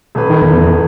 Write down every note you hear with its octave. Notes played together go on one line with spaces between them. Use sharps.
D#1 B4
D#3
E2